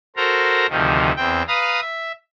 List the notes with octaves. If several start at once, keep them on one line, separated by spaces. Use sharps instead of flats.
F#4 A4 A#4 C5 A#5
D2 C3 D#3 F3
E2 C4 G5
B4 F5 A#5 D#6
E5